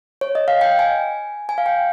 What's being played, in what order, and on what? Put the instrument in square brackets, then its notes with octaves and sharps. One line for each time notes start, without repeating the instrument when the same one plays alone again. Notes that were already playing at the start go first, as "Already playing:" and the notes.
[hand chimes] C#5
D#5
F5
G5
G#5
G#5
F5
G5